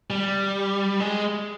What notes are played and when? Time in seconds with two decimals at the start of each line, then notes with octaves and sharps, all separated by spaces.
0.10 G3
1.00 G#3